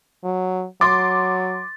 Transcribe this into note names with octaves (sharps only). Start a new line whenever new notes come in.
F#3
F#3 C6 D6 A6